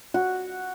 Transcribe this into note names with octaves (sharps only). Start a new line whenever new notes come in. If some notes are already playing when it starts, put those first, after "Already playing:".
F#4